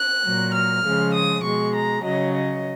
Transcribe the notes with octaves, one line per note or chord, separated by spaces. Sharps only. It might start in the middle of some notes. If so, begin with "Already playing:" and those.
Already playing: F#6
A#2 F#3
F6
C#3 F3 G#3
D#6
B2 G#3 C#6
A#5
C#3 F#3 D#5
D#5